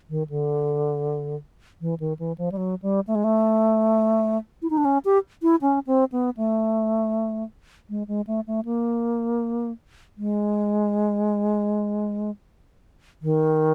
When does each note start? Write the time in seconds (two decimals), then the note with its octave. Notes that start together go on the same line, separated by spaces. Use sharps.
0.10 D#3
0.30 D3
1.81 E3
2.00 D#3
2.19 E3
2.38 F3
2.52 G3
2.57 F#3
2.82 G3
3.07 A3
3.15 G#3
3.24 A3
4.62 E4
4.70 D#4
4.77 D4
4.85 C#4
5.05 G4
5.42 E4
5.62 C#4
5.87 C4
6.12 B3
6.37 A3
7.90 G#3
8.08 G#3
8.27 A3
8.47 A3
8.65 A#3
10.18 G#3
13.22 D#3